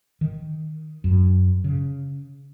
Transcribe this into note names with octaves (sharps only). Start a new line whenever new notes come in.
D#3
F#2
C#3